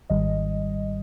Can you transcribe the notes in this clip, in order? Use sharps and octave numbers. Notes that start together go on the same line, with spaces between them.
G#1 G#2 D#3 G3 D#5